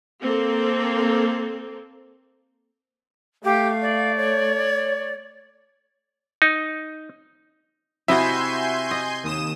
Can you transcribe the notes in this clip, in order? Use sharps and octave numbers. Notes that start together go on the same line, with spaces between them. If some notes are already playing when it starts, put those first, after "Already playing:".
A#3 C4 A4
A3 G4 F5
D5
C#5
D#4
C3 E4 F#4 D#5 E5 G#5 C6 G6
D#5
D#2 D#6 E7